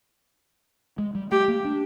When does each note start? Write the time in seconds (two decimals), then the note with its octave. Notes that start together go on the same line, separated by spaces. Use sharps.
0.98 G#3
1.15 G3
1.31 A3 G4
1.48 A#3
1.65 D4